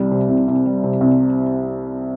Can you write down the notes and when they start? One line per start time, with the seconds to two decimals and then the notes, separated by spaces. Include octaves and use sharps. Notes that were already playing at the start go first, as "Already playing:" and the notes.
Already playing: C2 G3
0.11 C3
0.28 C2
0.48 C2
0.66 G3
0.84 C3
1.01 C2